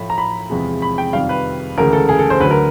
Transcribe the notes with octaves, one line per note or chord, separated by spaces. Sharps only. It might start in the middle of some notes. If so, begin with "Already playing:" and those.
Already playing: A2 F3 A3 B5
A#5
B5
E2 C3 F3 G#3
B5
G5
F2 C3 D#3 G3 F5
B4
D2 C#3 E3 G#3 A#4
A4
G#4
A4
C5
D2 D3 F#3 B4
A#4